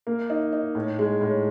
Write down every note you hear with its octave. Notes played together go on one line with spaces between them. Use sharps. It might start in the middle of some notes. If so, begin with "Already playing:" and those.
A#3
D#4
D#4
A2
G#3
A2